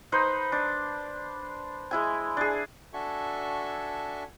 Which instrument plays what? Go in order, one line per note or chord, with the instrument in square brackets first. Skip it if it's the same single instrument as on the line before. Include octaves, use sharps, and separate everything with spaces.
[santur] D#4 B4 C5
D4
G#3 E4 G#5
D4 G#4
[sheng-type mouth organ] D4 F#4 A4 E5 G#5 C#6